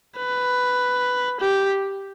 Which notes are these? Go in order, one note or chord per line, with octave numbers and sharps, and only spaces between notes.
B4
G4